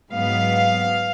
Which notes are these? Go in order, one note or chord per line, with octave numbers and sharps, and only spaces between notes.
G#2 F#3 B3 F5